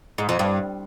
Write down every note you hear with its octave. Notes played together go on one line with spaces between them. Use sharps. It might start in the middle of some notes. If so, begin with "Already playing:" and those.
G#2
F2
G2